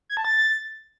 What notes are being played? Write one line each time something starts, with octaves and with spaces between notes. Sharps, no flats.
G#6
A5
A6